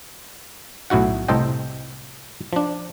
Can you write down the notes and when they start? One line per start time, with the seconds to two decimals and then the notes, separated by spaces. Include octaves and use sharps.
0.90 B1 A2 E4 F#4 F#5
1.28 C2 A2 A4 C5 D#5 G5
2.53 F3 D4